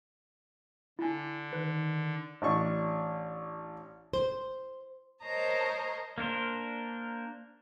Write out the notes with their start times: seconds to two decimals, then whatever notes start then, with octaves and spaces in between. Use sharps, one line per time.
0.99 D3 E4 G#5
1.53 D#3 B4
2.42 A1 D4 C#6
4.13 C5
5.22 A#4 C5 C#5 D#5 A5 A#5
6.18 A#3 D4 A#4 C5